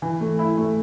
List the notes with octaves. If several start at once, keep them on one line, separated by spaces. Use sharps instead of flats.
E3
A3
E4
A3